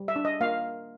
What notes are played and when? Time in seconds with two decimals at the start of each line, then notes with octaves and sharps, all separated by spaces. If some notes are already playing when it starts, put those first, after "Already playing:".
Already playing: G3
0.08 E5
0.16 D4
0.25 D#5
0.40 A#3 F5